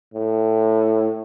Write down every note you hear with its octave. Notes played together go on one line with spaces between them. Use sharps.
A2